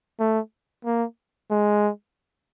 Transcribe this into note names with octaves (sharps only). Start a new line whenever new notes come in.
A3
A#3
G#3